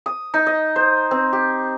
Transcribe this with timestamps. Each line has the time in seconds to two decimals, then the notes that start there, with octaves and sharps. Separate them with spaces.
0.06 D#6
0.34 D#4
0.46 D#5
0.76 C5
1.11 C4
1.33 G4